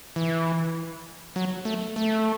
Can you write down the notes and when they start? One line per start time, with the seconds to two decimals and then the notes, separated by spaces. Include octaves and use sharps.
0.16 E3
1.36 F#3
1.65 A3
1.96 A3